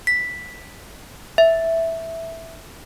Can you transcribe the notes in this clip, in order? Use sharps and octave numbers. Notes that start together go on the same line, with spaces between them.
B6
E5